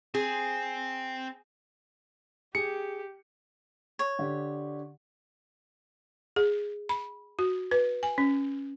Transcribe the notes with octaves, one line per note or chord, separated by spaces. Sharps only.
C4 G#4
G4 G#4 C#7
C#5
D3 G4
G#4
B5
F#4
B4
G#5
C#4